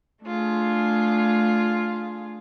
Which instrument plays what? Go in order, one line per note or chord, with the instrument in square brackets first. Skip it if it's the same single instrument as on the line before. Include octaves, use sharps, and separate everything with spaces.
[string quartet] A3 D4 F4 G#4